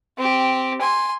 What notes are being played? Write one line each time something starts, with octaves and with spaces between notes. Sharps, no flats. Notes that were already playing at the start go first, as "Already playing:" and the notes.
C4 G4
G#5 C6